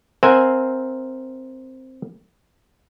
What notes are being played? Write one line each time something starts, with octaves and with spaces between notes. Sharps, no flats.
C4 A#4 C5 E5 F#5 G#5